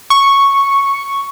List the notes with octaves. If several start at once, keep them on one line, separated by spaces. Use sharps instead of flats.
C#6